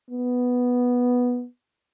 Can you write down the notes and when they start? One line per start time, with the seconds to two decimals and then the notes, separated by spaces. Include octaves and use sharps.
0.11 B3